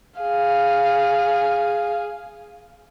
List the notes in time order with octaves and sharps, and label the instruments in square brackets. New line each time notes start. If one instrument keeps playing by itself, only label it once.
[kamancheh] G#4 F5